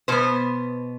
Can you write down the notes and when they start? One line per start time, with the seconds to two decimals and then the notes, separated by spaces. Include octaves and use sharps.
0.08 B2 B3 C5